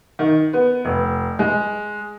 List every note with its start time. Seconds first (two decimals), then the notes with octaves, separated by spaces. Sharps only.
0.19 D#3
0.53 B3
0.85 F1
1.39 G#3